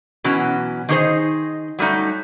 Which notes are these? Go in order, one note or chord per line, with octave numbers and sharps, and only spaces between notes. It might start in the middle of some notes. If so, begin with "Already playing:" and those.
B2 E3 F#3 C#4
D#3 D4 D#4 G#4 C5 D#5
F#3 G3 A3 D#4